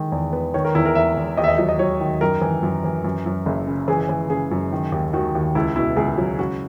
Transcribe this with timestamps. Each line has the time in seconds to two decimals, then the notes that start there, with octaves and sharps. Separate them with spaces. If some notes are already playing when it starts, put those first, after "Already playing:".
Already playing: D#3 G#3
0.12 E2
0.33 B3
0.54 D#3 C#5
0.65 A#4
0.75 E2 E4
0.86 A#4
0.95 E2 E5
1.17 E2
1.37 D#2 D#5
1.44 E5
1.48 D#5
1.58 F#3 D#5
1.69 D#5
1.79 F#3 C#5
2.00 D#3
2.21 F#2 A#4
2.41 E3
2.63 F#2
2.84 E3
3.04 F#2
3.26 F#2
3.46 F#1
3.67 C#3
3.88 E3 G#4
4.09 E3
4.30 C#3 G#4
4.51 F#2
4.72 D#3
4.92 D#2
5.13 D#3 F#4
5.35 D#2
5.55 C#2 E4
5.76 B2 E4
5.96 C#2 G#4
6.18 F#3
6.39 C#3 F#4